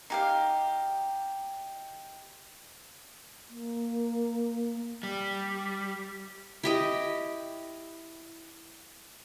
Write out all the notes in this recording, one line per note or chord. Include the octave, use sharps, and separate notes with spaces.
D#4 G4 F5
A#3
G3
E4 G4 D#5